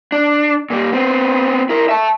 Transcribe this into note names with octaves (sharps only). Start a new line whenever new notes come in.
D4
A#2 G3
B3 C4
E4 A#4
E5 A5